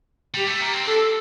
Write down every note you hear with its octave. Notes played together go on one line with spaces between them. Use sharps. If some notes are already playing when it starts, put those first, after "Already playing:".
G3 G4
A3
A#3
C4
D4 A4